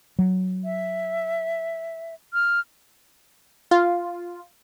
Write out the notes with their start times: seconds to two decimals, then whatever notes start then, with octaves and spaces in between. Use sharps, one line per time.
0.19 F#3
0.64 E5
2.34 F6
3.71 F4